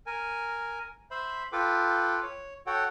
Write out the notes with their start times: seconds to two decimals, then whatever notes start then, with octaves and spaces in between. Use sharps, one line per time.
0.06 A#4 G#5
1.11 C5 E5 B5
1.52 F4 A4 B4 G5 D6
2.23 C#5
2.67 F#4 A4 C#5 F#5 G5